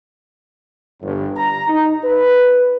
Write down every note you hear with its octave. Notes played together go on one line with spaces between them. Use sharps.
G1
A#5
D#4
B4